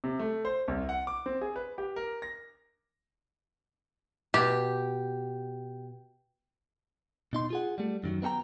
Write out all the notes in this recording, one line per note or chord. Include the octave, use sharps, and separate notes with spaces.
C3
A3
C5
C2
F#5
D6
C4
G#4
B4
G4
A#4
A#6
B2 G4
B2 D#4 C6
F4 G#4 F#5
G3 A3
F#2 D#3 F#3
B3 D#4 A4 G5 A#5